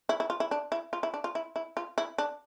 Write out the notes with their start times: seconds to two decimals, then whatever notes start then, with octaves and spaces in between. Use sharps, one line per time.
0.09 E4
0.20 E4
0.30 F4
0.40 E4
0.51 D4
0.72 E4
0.93 F4
1.03 E4
1.14 D4
1.24 F4
1.35 E4
1.56 E4
1.77 F4
1.98 E4
2.18 D4